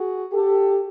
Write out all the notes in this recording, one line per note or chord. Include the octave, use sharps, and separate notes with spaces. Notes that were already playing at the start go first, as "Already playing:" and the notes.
Already playing: F#4 G#4
G4 A4